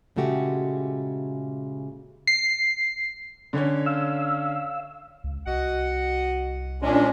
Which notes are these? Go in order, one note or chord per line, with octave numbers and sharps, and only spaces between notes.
A#2 C#3 G#3 A3 F#4 G4
C7
D3 C#4 C#5
F5 E6
C#2
C2 F#4 D#5 F#5
A#2 G#3 C#4 D4